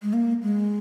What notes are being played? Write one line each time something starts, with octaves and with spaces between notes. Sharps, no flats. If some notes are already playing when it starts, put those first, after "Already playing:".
G#3
A#3
G#3